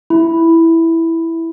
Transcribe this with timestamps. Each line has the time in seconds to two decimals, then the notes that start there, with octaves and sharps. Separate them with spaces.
0.10 E4